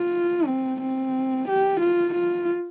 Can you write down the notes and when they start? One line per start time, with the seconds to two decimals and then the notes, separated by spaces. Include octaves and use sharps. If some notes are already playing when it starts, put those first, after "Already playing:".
Already playing: F4
0.46 C4
0.81 C4
1.48 G4
1.81 F4
2.15 F4